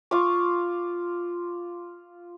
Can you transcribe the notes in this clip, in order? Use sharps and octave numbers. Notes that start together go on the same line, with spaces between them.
F4 C#6 D6